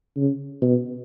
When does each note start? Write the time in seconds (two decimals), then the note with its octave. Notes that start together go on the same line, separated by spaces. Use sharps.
0.17 C#3
0.62 B2